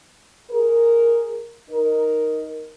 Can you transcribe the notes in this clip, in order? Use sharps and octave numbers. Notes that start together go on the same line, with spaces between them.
G#4 A#4
D#4 A#4